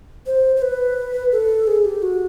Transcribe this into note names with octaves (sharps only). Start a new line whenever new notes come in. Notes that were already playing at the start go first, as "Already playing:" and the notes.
C5
C5
B4
A4
G#4
G4
F#4